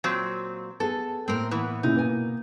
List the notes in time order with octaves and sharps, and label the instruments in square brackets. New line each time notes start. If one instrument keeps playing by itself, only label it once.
[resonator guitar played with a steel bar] A#2 F#3 C4
[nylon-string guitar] B3 G#4 [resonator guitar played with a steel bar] A4
[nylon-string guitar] A2 A3 A#3 [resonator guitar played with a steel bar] C4 A#4
[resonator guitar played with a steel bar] E3 B3
[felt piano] A#2 C#3 E4 [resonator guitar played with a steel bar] D#4
[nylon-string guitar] B2 G#5 [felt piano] A#3